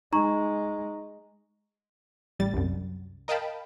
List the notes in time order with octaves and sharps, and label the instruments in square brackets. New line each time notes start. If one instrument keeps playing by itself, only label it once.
[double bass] G#3 [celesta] D#4 A#5 C#6
[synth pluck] A1 G3 A6
C2 F#2
A#4 D#5 F5 G5 A5 B5